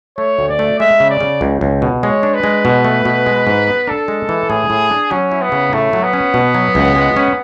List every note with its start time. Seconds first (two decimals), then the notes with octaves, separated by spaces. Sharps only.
0.17 A3 C#5
0.39 D2
0.49 D5
0.59 A3
0.79 G#3 E5
1.00 C#3
1.10 D5
1.21 C#3
1.41 C#2
1.61 C#2
1.82 B2
2.03 G#3 C#5
2.23 D4
2.34 B4
2.44 G#3
2.65 B2
2.84 A3
3.05 B2
3.26 G#3
3.47 G#2
3.67 B3
3.87 D4 A4
4.08 G#3
4.29 E3
4.49 A2 G#4
4.70 A2
4.91 D4
5.11 F#3 C#4
5.32 E4
5.41 B3
5.52 C#3
5.73 A2 A3
5.93 F#3
6.03 B3
6.13 C#4
6.34 B2
6.55 F#3
6.75 C#2
6.96 G#3
7.16 C#4